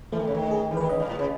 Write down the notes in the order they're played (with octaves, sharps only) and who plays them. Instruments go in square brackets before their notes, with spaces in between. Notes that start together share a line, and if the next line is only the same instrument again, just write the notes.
[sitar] E3 [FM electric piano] A3
[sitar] D#3
C#3
D#3
[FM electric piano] G#4
[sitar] E3
[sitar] D#3 [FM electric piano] B4
[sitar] C#3 [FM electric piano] D#5
[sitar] G#2
A2
C#3